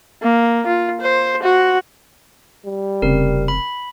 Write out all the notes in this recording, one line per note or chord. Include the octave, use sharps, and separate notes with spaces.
A#3
F4
C5
F#4
G3
F1 C#3 C4 A#4
B5